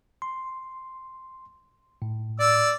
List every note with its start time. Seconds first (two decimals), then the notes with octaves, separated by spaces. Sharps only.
0.22 C6
2.02 A2
2.40 D5 E6